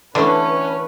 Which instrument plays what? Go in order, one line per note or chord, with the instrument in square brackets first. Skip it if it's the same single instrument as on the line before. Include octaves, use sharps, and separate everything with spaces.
[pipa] D3 [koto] E3 A3 [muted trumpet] C#4 [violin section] B4